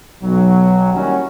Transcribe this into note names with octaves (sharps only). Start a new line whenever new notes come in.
B1 F#3
D#3 G3 A#3 C#4 E4 F#4